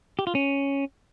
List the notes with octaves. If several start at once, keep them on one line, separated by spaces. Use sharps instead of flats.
G4
F4
C#4